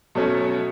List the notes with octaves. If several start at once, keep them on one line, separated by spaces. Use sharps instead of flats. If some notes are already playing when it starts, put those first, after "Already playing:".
B2 F#3 A3 C#4